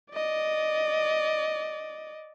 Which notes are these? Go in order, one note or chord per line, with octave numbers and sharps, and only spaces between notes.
D5 D#5